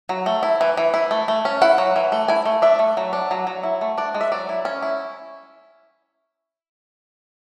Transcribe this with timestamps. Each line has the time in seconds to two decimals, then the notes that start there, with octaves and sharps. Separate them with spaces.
0.09 F#3
0.26 A3
0.43 E4
0.61 E3
0.77 E3
0.94 E4
1.11 A3
1.28 A3
1.45 C#4
1.61 E4 F#5
1.78 F#3
1.96 E3
2.12 A3
2.28 E4 G#5
2.45 A3
2.62 D4 E5
2.79 A3
2.97 F#3
3.13 D4
3.31 F#3
3.47 F#3
3.63 E4
3.81 A3
3.98 D4 D5
4.14 G#3
4.21 E5
4.32 F#3 D5
4.49 E4
4.65 C#4
4.82 E4